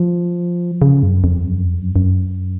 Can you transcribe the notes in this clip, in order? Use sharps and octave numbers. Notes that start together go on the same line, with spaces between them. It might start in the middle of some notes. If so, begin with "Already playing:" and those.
Already playing: F3
C#3
F#2
F2
F#2
F2
F#2
F#2